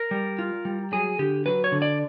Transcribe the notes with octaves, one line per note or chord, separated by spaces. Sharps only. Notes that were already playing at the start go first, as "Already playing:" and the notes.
Already playing: A#4
G3
F4
G3
F#3 G#4
D3 G4
F#3 B4
C#5
D3
D5